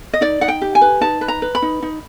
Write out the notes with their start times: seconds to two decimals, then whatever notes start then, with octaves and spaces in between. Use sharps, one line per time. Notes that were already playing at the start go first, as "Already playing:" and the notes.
0.13 D#5
0.21 D#4 D5
0.41 D#4 F#5
0.48 G5
0.61 G4
0.75 G#5
0.81 B4
1.01 D#4 A5
1.21 B4
1.28 A#5
1.42 B4
1.55 B5
1.62 D#4
1.82 D#4